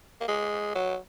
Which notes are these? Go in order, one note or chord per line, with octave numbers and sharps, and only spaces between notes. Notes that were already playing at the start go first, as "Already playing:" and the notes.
A#3
G#3
F#3